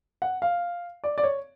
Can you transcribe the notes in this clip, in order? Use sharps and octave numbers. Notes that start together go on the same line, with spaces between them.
F#5
F5
D5
D5
C#5